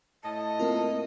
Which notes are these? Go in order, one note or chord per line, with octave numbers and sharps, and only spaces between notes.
A2 D#5 A5
A#3 C4 F4 A#4